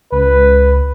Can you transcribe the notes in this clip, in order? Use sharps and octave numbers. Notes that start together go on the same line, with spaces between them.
C#2 B4